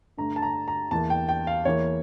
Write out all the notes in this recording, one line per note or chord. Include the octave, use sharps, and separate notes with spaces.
G2 D3 A3 A#5
A5
A#5
A#5
E2 E3 A#3 A5
G5
G5
F5
E2 E3 A#3 C#5